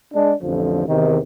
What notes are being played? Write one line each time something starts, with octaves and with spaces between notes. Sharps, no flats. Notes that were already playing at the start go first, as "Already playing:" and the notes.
G#3 D4
A1 F2 D3 F3
E2 C3 D#3